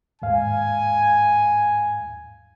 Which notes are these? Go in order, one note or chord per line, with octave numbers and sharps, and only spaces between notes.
D#2 G#2 F5 G#5